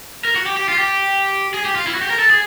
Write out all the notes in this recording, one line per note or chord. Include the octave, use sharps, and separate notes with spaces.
A#4
F#4
G4
G4
F4
G4
G#4
G4
F4
E4
F#4
G4
A#4
A4
G#4